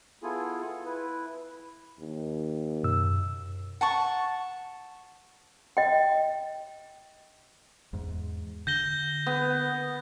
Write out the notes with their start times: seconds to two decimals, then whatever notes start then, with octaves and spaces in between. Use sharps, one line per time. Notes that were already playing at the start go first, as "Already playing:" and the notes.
0.23 B3 E4 F4 G#4 A4 G#5
0.86 E4 B4
2.00 D#2
2.83 F#2 B2 E6
3.81 F#5 A5 C#6
5.77 D#5 G5
7.93 E2 G#2
8.67 D3 G6 A#6 G7
9.27 B3